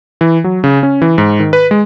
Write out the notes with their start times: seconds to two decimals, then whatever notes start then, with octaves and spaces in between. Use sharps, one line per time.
0.21 E3
0.44 F#3
0.64 C#3
0.83 C#4
1.02 E3
1.18 G#2
1.40 D#3
1.53 B4
1.71 G#3